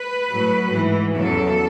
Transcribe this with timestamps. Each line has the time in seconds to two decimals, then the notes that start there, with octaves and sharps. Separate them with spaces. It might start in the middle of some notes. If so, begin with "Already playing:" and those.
Already playing: B4
0.29 A2 F#3
0.71 G#2 E3
1.14 E2 C#3 F#3 A4